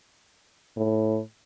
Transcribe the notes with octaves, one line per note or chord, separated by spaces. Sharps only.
A2